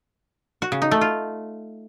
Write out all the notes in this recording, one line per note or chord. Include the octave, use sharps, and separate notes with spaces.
F#4
C#3
D#4
A3
F4